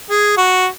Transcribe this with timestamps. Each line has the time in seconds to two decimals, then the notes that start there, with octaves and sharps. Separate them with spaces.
0.10 G#4
0.37 F#4